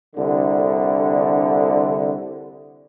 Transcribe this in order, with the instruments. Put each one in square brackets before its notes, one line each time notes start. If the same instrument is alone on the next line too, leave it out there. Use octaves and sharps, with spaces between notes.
[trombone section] C2 D3